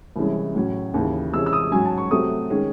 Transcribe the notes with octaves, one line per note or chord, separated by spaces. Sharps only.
C2 C3 E3 G#3 C#4
A2 F#3 C#4
D#2 C#3 E3
C#2 C3 E3 G#3 C#4 E6
E6
D#6
G#2 F#3 C#4 G#5
A5
C#6
C3 F#3 A3 C4 D#6
D#3 G#3 C#4